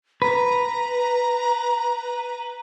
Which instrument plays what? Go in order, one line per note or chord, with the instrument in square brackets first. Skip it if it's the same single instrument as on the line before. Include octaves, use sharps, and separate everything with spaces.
[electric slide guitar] B4 [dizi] A#5